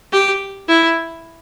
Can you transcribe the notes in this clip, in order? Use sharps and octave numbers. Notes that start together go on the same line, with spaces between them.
G4
E4